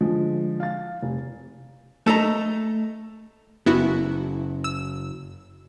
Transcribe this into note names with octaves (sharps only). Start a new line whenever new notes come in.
D3 F3 G#3
F5 A6
F1
A3 A4 D#5 A#5
F#1 B3 E4 F#4
E6